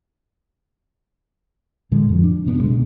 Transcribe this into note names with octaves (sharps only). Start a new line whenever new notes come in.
A2 D3 G#3
F2 F3
D4
G1 C3 B3 D4
D1 G2 B2 G#3
B2